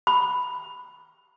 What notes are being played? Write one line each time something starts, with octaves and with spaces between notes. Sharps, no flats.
B5